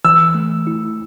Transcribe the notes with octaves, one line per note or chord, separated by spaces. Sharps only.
E3 E6
A3
E4